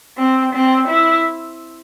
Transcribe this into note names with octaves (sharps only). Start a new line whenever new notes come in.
C4
C4
E4